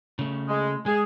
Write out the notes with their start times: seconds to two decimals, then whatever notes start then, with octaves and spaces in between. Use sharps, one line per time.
0.19 C#3 A3
0.49 G#3
0.86 G#3 G#4